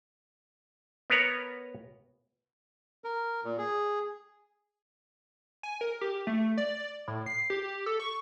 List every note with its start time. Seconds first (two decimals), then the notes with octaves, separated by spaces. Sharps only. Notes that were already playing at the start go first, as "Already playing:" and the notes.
1.10 B3 A#4 B4 C#5 A#5
3.04 A#4
3.44 A#2
3.58 G#4
5.63 G#5
5.81 A#4
6.01 G4
6.27 A3
6.58 D5
7.08 A2
7.26 C7
7.50 G4
7.86 A4
8.00 C#6